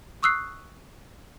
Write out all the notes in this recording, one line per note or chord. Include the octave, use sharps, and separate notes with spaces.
C#6 D#6 E6 F#6 C7